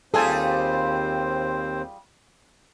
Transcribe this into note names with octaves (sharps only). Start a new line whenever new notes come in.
D#2 G3 C4 F4 G#4 A4 C5 G#5